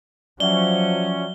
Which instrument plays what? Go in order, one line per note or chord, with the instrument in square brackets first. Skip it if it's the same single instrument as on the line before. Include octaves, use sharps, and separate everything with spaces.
[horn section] F3 C#4 [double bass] F#3 [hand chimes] D5 E5 F#5 [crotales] G7